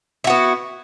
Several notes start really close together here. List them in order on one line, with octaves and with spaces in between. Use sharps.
E4 F#4 B3